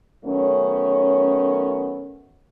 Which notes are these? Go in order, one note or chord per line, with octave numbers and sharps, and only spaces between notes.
F#2 D#3 A3 B3 C#4